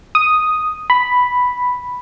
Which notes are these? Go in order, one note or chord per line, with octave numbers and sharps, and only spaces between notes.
D#6
B5